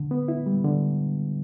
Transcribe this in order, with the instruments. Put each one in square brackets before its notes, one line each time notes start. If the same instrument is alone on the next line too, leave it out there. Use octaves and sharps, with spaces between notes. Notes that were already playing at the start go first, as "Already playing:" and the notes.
Already playing: [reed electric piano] D3
B3
E4
G3
D3